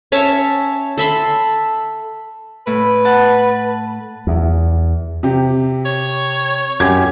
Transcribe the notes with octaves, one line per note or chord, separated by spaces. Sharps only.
C#4 C#5 E5 A5
A4 E5 B5 C6
A2 B4
F#5 A5
E2
C3 G4
C#5
F#2 G4 G#6